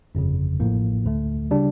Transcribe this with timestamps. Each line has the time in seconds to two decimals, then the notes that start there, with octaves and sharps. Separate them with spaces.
0.15 G1 F2 C#3
0.60 A1 A2 F3 A#3
1.05 D2 D3 A3
1.51 C#3 G3 D4